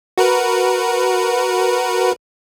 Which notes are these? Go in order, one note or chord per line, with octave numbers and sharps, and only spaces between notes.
F#4 A#4 B4